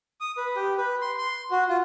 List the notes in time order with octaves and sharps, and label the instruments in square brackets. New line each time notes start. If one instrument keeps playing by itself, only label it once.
[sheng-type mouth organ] D#6
B4
G4
B4
C6
C6
F#4
F4